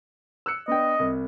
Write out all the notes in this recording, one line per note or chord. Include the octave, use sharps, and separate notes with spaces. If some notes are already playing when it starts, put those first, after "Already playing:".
E6 F#6 C#7
B3 D4 D#5 G5
C2